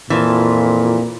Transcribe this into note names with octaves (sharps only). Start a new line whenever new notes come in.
F2 A#2 E3 F3